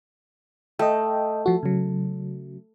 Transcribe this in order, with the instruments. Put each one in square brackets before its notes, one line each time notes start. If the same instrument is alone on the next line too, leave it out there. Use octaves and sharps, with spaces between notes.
[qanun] A3 [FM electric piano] D#5 G5
[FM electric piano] F3 F#4
C#3 F#3